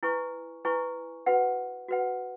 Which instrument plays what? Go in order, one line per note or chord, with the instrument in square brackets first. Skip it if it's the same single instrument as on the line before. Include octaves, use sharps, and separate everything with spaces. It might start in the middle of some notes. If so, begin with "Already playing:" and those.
[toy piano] E4 B4 G#5 C#6
E4 B4 G#5 C#6
F#4 B4 F#5
F#4 B4 F#5